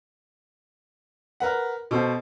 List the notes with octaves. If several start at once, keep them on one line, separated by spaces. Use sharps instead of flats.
A#4 B4 F#5
B2 A4 C5